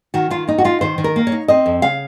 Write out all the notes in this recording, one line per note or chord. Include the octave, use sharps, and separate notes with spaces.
D#3 F#4
D#3 F4
A#3 D#4
F#4
D#4 F4
D#3 C5
D#3
A#4
A#3
C#5
D#4
C4 D#5
F2
C#3 F5